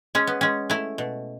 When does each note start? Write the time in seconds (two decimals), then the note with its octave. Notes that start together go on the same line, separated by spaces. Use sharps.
0.15 G#3 C#4
0.27 B3
0.41 G#3 C#4
0.70 A3 E4
0.98 B2